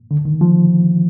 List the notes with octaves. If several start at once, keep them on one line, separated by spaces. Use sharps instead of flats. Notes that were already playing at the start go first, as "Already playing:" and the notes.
D3
D#3
F3